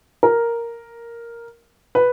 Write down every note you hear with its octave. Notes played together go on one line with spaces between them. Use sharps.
A#4
B4